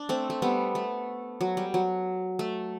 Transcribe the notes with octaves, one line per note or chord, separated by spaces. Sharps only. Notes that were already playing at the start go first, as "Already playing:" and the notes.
Already playing: D4
A3 C4
A3
G3 B3
A3
F#3
G3
F#3
A3